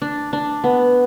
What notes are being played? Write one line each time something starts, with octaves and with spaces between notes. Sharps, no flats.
D4
D4
B3